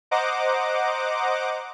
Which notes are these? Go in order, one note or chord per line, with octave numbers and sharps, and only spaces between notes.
C5 D#5 F#5 A#5 D6